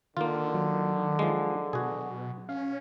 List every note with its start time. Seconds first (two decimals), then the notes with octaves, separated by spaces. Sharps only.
0.17 D3 D#3 A#3 F4
0.54 F#3
1.19 F3 G#3
1.73 B2 F#4 G#4
2.49 C#4 F5